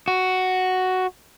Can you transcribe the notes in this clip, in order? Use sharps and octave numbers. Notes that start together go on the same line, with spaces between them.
F#4